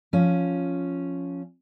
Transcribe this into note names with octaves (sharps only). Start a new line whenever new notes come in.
F3 C#4